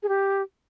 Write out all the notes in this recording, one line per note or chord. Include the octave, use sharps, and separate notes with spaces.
G#4
G4